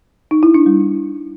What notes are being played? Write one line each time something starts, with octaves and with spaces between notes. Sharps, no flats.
D#4
E4
D4
G3